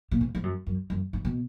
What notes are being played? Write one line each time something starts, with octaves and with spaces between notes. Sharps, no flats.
A#2
G#2
G#2
F#2
F#2
F#2
G#2
B2